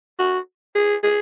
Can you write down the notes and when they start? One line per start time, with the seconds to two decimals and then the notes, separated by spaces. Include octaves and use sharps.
0.19 F#4
0.76 G#4
1.03 G#4